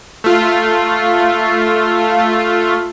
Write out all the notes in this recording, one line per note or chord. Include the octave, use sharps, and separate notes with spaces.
A3 F4